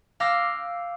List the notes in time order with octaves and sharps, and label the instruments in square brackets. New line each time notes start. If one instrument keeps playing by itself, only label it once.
[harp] F5 G5 D6 E6 A#6